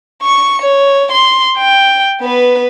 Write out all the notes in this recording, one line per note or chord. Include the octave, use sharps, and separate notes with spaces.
C#6 C#7
C#5
C6
G5
B3 B4